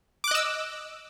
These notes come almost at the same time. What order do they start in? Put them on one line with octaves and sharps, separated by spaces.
D6 F#6 D#5 E6